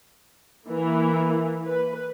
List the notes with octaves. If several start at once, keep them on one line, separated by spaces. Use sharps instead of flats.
E3 A#3
B4